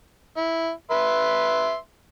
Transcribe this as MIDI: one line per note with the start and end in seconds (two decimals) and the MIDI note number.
0.37 0.70 64
0.91 1.76 71
0.91 1.76 76
0.91 1.76 84